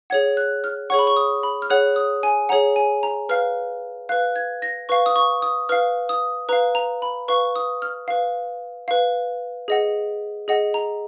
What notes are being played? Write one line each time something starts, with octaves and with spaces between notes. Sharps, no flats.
G#4 C#5 F#5 G#6
F#6
F6
G#4 C#5 F#5 C#6
B5
C#6
D#6
B5
F6
G#4 C#5 F#5 F#6
D#6
G#5
G#4 C#5 F#5 A#5
G#5
A#5
B4 F5 F6
B4 F5 F#6
G#6
A#6
B4 F5 C#6
D#6
C#6
D#6
B4 F5 F6
D#6
B4 F5 A#5
A#5
B5
B4 F5 C#6
D#6
F6
B4 F5
B4 F5
G#4 D#5 F#5
G#4 D#5 F#5
A#5